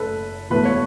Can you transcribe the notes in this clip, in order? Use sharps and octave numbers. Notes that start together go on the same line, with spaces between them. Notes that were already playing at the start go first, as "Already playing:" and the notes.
Already playing: F#1 F#2 C#3 A4 B4
E1 E2 B2 A3 B4
C#5